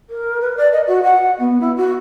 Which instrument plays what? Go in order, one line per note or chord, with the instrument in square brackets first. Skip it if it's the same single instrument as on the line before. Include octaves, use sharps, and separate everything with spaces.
[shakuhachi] A#4
B4
D5
D#5
F#4
F#5
B3
E4
F#4